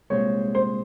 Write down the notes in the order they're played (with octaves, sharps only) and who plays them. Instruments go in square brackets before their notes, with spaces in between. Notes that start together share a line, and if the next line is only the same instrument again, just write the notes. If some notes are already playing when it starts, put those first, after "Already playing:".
[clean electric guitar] C2 A#2 G#3 C4 [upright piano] C#5
[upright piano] C5